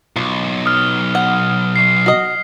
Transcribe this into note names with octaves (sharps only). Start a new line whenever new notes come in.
B1 F4
D#6 F6
F#5
C7
F#4 D#5